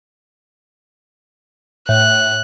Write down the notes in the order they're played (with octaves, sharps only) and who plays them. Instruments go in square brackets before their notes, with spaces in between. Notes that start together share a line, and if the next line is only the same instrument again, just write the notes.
[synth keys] A2 [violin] F#6